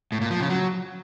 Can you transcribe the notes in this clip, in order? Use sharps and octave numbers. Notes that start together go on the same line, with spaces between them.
A2
A#2
F3
C#3
F#3